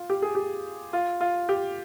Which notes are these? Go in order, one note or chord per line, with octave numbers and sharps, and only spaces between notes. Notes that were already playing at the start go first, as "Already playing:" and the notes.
Already playing: F4
G4
G#4
G4
F4
F4
G4